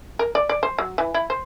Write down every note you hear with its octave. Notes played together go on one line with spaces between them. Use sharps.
A#4
D5
D5
C5
F#3
E3
E4
C5